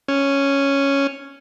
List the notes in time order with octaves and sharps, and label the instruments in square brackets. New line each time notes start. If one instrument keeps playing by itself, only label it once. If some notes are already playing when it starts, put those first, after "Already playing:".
[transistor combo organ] C#4